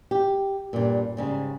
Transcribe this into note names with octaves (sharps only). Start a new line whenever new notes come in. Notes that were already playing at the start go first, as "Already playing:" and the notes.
G4
G2 A#2
G#2 C#3 G3